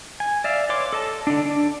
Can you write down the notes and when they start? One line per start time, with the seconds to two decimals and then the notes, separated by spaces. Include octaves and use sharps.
0.20 G#5
0.44 D5 E5 F5
0.69 B4 C#5 C6 D6
0.93 A4 D#5 A5
1.27 D3 D4
1.46 D4